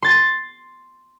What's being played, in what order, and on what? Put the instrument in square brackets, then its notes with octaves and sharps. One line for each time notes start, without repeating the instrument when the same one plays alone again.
[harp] C6 A6